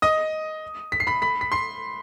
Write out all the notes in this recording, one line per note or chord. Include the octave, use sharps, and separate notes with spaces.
D#5 D#6
B6
C7
B5 B6
B5 B6
B6
C6 C7